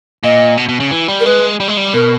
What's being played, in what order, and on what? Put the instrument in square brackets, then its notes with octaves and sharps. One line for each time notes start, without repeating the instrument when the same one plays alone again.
[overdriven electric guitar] A#2 [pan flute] D#5
[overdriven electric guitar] B2
B2
C#3
E3
G3
[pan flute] A#4
[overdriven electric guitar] G#3 [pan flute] B4
[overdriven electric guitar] G3
G#3
G3
[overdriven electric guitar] B2 [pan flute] A#4